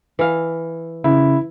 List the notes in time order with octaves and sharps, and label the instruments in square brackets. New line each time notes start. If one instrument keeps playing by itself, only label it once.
[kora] E3 F5
[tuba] C#3 [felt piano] E4